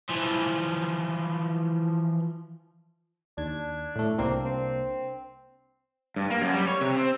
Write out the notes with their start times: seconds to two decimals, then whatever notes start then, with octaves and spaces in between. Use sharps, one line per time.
0.09 E3 F3
3.38 D#2 D4 G#6
3.96 A2 A3
4.19 C2 A#3 C4 D4
4.45 C4
6.16 G2
6.30 A#3
6.42 F#2
6.53 G3
6.68 C#5
6.81 C3
6.97 C4